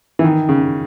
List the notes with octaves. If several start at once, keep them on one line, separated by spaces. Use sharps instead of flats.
E3
D#3
C#3